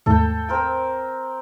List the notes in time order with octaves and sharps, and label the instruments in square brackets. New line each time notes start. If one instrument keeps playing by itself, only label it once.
[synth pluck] D#2 G#2 A3 [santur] A4 G5
[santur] C4 A#4 G5